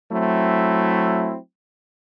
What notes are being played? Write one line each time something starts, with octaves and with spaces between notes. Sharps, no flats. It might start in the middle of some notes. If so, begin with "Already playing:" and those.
F#3 A3 C4 E4